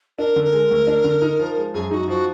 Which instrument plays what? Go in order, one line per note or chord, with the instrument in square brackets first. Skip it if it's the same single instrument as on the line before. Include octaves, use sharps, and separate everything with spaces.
[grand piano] D4 [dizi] A#4
[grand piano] D3
[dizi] A#4
[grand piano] G#3
D2
D4
D3
D#4
F3
G#3
[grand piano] F#2 [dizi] G#4
[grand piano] D#4 [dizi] F#4
[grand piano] F3 [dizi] F#4